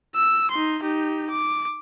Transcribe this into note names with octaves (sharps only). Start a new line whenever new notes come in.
E6
D#4 C6
D#4 G4
D6